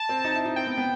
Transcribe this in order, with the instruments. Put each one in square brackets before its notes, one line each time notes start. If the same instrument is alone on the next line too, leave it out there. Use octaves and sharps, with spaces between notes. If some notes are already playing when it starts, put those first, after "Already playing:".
Already playing: [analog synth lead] A5
[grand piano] C4
D#4
E4
D#4
[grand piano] C4 [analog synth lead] G5
[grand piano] B3
B3